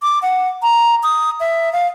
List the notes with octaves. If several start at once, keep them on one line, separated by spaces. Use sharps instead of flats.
D6
F#5
A#5
D#6
E5
F5